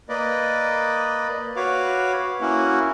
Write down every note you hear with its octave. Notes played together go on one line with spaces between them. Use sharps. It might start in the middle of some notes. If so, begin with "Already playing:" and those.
A#3 B4 D5 D#5
F#4 B4 C#5 F5 D6
A#3 C#4 E4 F#4